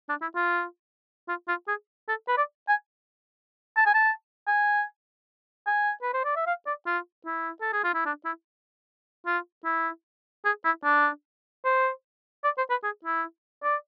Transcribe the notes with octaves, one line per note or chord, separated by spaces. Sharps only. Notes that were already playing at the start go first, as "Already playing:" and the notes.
D4
E4
F4
F4
F4
G#4
A4
B4
D5
G#5
A5
G#5
A5
G#5
G#5
B4
C5
D5
E5
F5
D5
F4
E4
A4
G#4
F4
E4
D4
E4
F4
E4
G#4
E4
D4
C5
D5
C5
B4
G#4
E4
D5